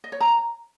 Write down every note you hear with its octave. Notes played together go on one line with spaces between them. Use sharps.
D#5
C#5
A#5